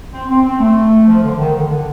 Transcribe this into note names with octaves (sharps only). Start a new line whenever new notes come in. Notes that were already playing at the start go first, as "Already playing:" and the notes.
C4
C4
C4
A3
F3
D3
D#3
D3
D3